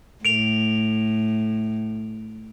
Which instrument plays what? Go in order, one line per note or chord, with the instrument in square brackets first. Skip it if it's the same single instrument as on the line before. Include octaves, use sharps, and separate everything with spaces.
[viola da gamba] A2 [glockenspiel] D7 F7